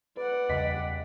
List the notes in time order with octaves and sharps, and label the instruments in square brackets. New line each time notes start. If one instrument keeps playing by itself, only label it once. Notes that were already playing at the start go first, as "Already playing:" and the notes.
[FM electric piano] B4 [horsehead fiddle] D5 F#5
[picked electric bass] E2 C#3 G3 [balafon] D#5 [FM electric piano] B6